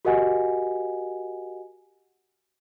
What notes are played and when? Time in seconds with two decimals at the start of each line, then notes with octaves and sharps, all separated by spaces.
0.05 F#4 G4 A#4 D#5 F#5 G#5